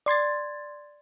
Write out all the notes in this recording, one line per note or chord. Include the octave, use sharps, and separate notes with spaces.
D5 C6 G#6 A6